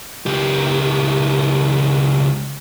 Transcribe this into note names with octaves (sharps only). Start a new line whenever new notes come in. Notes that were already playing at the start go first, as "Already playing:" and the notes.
C#2 G4